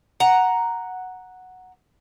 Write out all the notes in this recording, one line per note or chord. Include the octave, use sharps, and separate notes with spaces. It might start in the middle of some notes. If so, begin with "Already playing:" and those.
F#5 A#5